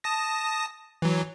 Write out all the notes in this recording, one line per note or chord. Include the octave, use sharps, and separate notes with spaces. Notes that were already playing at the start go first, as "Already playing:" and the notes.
A5 D#6 A#6
E3 F#3